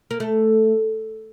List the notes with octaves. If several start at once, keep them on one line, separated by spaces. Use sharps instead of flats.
A#3
A3